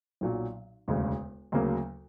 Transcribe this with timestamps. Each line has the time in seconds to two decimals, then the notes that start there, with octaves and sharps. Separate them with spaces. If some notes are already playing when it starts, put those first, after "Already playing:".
0.21 B1 A#2 F#3
0.88 E1 D2 C#3
1.52 D2 C#3 F#3 A#3